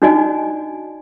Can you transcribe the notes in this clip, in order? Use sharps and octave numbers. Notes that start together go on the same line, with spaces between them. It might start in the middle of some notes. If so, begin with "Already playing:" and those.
D4 D#4 F#4 D5 D#5 G#5